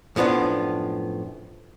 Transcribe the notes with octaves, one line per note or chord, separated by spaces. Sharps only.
F#2 A2 F3 B3 D4